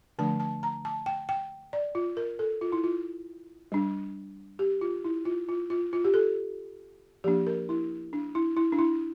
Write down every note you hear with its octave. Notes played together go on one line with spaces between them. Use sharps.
D3 F3 A3 D4 A5
A5
A#5
A5
G5
G5
D5
F4
A#4
A4
F4
E4
F4
G3 D4
G4
F4
E4
F4
F4
F4
F4
G4
A4
F3 A#3 D4 G4
A#4
E4
D4
E4
E4
D4
E4